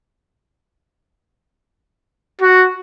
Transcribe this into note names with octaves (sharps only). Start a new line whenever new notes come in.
F#4